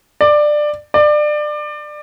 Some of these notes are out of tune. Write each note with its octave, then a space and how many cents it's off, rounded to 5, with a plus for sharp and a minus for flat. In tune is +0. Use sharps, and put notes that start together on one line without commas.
D5 +15
D5 +25